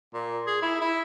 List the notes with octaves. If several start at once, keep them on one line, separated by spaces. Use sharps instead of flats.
A#2
G#4
E4
E4